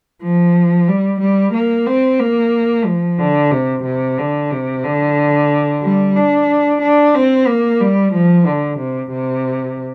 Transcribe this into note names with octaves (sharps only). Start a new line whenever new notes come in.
F3
G3
G3
A#3
C4
A#3
F3
D3
C3
C3
D3
C3
D3
G3
D4
D4
C4
A#3
G3
F3
D3
C3
C3